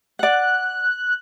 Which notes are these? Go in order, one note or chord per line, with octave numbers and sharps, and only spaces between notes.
D5 F#5 F#6